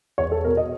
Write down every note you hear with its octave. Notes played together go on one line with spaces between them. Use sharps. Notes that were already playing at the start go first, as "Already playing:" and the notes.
E2 C#5
A4
B2 A#4
D#5